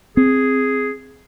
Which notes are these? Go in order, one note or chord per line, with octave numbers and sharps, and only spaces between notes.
C4 G#4